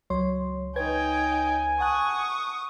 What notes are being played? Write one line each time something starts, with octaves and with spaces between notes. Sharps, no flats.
C#2 F#3 C#5 C6
D#4 B4 C#5 G5 G#5 G#6
F#5 A5 C#6 D#6 F#6